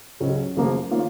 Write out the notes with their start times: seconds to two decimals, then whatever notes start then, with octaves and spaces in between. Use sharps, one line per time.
0.20 C#2 C#3 F#3 C#4
0.56 F#2 C#3 F3 A#3 F4
0.91 D#3 A#3 C#4 F4